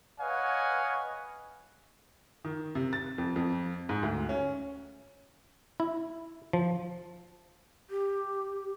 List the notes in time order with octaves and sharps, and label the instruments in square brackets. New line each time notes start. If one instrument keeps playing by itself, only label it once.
[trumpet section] B4 C#5 D#5 F5 F#5 G#5
[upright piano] D#3
C3
A6
F2
F2
G#2
D2
C#4
[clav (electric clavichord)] E4
F3
[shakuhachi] G4